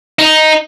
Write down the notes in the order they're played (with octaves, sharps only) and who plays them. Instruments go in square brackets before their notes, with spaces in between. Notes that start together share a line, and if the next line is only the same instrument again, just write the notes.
[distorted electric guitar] D#4